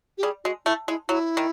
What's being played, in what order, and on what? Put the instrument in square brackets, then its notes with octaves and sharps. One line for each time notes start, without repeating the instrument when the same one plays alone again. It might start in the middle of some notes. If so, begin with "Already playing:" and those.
[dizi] G4
[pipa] G3 [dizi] G#4
[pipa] G#3 [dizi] F#4
[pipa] A3 [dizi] E4
[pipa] G#3 [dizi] E4
[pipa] F#3 [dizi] E4
[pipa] D#3